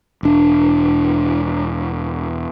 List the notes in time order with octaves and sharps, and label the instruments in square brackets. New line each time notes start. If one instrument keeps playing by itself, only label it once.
[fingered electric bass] E1 D4